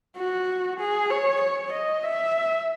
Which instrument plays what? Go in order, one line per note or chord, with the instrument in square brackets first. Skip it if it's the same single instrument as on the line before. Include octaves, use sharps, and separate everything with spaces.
[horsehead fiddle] F#4
G#4
C#5
C#5
D#5
E5